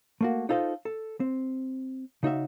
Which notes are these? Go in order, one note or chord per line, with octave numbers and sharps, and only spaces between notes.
A3 A#3 F#4
D#4 F4 A4 C5 D#5
A4
C4
C#3 D#4 F#4 E5